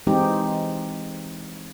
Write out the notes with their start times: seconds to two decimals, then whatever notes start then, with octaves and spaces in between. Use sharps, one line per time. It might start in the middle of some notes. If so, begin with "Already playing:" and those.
0.07 E3 G#3 C4 D#4 G4